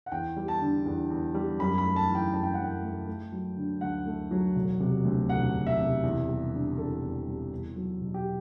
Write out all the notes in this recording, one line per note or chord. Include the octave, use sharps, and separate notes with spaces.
F#5
E2 G5
G3
A5
D3
E2
E2
G3
F#2 B5
B5
A3
A5
E3
G5
F#2 A5
G5
F#2 F#5
G5
A3
A3
F#3
D3
D2 F#5
A3
F#3
E1
C3
D2
E1 F#5
E1
E5
C3
E2
G3
D3
E2 A4
E2
G3
E2
F#3
B2
G4